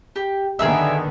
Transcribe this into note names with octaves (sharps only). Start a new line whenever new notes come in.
G4
D3 D#3 B3 G#4 A#4 E5